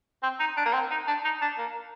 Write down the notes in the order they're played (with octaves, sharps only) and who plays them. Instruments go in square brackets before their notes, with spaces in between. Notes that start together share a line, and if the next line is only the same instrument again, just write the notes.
[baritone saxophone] C4
D#4
D4
A#3
C4
D#4
D4
D#4
D4
A#3